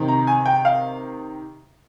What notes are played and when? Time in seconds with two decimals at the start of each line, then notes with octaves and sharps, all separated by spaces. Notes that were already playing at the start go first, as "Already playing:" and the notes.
Already playing: C3 D#3
0.08 A#5
0.27 G#5
0.46 G5
0.65 F5